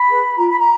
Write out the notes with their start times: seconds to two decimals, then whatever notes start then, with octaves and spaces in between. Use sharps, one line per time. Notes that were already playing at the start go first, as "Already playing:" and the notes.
Already playing: B5
0.08 G#4 B4
0.37 F4 A#5
0.47 B5
0.58 A#5